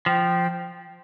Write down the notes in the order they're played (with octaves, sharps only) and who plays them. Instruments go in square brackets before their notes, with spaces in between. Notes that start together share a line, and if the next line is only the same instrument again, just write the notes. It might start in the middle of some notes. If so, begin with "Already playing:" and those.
[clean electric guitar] F3 [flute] G5